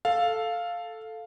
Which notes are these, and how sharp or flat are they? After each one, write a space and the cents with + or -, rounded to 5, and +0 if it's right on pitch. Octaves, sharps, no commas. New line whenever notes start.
A4 +0 F5 +0